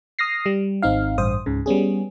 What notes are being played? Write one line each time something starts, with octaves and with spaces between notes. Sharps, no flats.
D#6 F6 A#6 C7
G3
G#1 C4 D#4 F5
A1 G2 C5 D#6
C#2 G#2 C#3
G3 B3 C#4 G#4